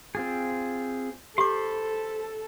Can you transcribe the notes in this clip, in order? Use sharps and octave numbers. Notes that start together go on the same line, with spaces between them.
C4 F4 G#4
G4 A4 C5 B5 C6 D6